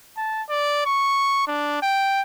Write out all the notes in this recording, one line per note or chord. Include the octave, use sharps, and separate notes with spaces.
A5
D5
C#6
D4
G5